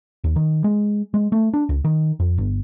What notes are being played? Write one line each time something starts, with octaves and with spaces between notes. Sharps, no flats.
D#2
D#3
G#3
G#3
A3
D4
C#2
D#3
F2
G1